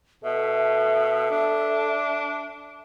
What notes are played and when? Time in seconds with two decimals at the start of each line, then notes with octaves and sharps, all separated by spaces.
0.24 B2 A4 E5
1.30 D4